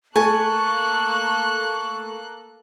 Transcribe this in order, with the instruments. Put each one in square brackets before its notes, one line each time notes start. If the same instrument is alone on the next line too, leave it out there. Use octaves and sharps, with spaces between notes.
[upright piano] A3 [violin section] A#3 A4 F#6 [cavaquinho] G#5 A5 [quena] C#6